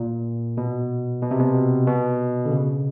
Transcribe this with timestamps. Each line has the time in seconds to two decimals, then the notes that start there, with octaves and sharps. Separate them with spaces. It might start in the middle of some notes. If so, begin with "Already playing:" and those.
Already playing: A#2
0.57 B2
1.22 B2
1.31 C3
1.40 B2
1.87 B2
2.45 D3
2.51 C#3